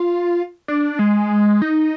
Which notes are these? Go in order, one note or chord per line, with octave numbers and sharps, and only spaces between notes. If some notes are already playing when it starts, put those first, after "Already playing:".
Already playing: F4
D4
G#3
D#4